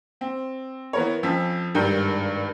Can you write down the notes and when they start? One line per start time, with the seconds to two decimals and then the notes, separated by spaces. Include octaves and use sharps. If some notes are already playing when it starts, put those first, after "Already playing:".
0.21 C4
0.93 E3 B3 A#4 C#5
1.23 F2 F3 C#4 E6 B6
1.75 G#1 G2 G4 A#4 G6